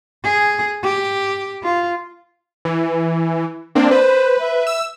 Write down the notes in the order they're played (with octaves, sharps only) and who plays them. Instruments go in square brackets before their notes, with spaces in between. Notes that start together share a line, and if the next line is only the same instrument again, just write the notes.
[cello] G#4
G4
F4
[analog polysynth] E3
A#3 C4 D4
[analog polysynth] B4 [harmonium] C5
[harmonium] E5
[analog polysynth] E6